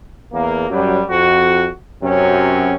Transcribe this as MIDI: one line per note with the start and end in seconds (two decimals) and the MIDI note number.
0.33 0.66 40
0.33 0.66 58
0.70 1.02 42
0.70 1.02 54
0.70 1.02 55
1.09 1.68 41
1.09 1.68 66
2.03 2.76 42
2.03 2.76 48
2.03 2.76 54
2.03 2.76 60
2.03 2.76 61